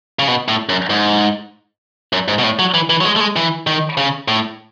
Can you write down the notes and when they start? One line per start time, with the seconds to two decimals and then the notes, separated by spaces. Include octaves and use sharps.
0.19 C#3
0.28 B2
0.48 A2
0.69 F#2
0.90 G#2
2.13 F#2
2.28 G#2
2.38 B2
2.44 A2
2.59 F#3
2.74 E3
2.90 E3
3.01 F#3
3.05 G#3
3.16 A3
3.20 G#3
3.36 E3
3.67 D#3
3.97 C#3
4.28 A2